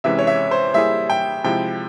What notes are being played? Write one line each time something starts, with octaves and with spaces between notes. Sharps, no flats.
C3 E3 G#3 C#4 E5
C#5
E5
C5
G3 A#3 E4 G#4 E5
G5
C3 F3 G#3 E4 G5